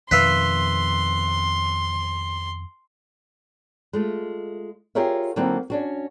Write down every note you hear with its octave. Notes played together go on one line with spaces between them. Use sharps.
F2 B2 D#3 B4 E5 F5 C6
G#3 A3 F4
F4 G4 G#4 A#4 C#5 E5
D3 F#3 A#3 C4 D#4 E4
C#4 D4 F#4